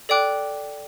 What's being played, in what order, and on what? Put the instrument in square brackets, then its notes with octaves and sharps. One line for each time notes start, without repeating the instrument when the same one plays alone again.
[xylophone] A4 D5 G5 D6 F#6